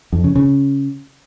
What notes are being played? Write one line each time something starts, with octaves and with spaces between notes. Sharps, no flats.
F2
C#3
C#3